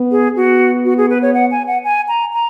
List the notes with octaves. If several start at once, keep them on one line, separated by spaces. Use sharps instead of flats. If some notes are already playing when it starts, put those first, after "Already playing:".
Already playing: B3
G#4
B3 F#4
F#4
G#4
B4
C#5
F#5
G#5
F#5
G#5
A#5
A#5